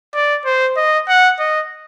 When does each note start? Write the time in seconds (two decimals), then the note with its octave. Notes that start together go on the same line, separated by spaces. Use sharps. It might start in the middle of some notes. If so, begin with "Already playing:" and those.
0.14 D5
0.45 C5
0.77 D#5
1.09 F#5
1.39 D#5